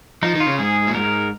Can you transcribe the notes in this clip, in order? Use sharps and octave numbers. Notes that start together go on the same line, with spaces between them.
F3 D#4
D#3
F4
C#3
G#2 G#4
A#2
G#2 A#4